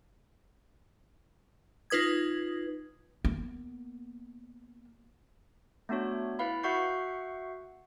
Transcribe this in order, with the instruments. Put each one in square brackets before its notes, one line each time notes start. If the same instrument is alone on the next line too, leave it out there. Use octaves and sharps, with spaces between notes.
[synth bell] D#4 F4 B4 D#6 G#6
[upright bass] A#3 B3
[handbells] A3 B3 D4 F#4 C#5
E4 B4 F5 B5
F#4 E5 F#5 C#6 G6 C7